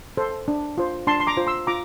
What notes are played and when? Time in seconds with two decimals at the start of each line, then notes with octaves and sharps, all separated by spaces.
0.17 A4 C5
0.48 D4
0.78 F4 C5
1.07 D4 A5 C6
1.20 C6
1.27 A#5 D6
1.37 F4 C5
1.47 C6 E6
1.67 F4 A#5 D6